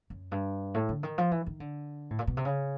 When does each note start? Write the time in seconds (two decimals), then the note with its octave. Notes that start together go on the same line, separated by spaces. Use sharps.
0.10 F#2
0.31 G2
0.74 A2
0.89 D3
1.03 D#3
1.18 F3
1.31 E3
1.46 D#3
1.60 D3
2.10 A2
2.19 A#2
2.27 B2
2.37 C3
2.45 C#3